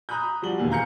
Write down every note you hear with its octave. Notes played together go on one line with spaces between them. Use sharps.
A#5 B5 D#6 F#6 G6
F3 G3 F#4 D5 F#7 G7
E1 D#2 G#5
E1 F5 A#5 G6 C#7